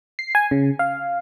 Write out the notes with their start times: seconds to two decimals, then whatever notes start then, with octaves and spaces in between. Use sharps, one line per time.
0.19 C7
0.35 G#5
0.51 C#3
0.79 F5